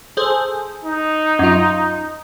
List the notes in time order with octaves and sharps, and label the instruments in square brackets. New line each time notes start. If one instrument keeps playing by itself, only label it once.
[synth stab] G#4 A4 C5
[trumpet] D#4
[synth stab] F#2 F4